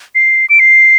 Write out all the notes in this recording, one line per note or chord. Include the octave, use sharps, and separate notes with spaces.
C7
D7
C7